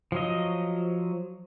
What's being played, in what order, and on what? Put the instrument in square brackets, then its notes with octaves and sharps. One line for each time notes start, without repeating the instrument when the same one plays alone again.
[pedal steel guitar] F3 F#3 D#5